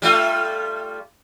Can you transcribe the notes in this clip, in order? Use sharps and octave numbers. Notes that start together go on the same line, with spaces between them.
G3 A3 F4